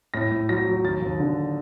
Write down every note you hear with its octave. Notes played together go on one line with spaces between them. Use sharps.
A2 A#6
A2
F#3 A#6
F#3
D#2 A6
D#2
D3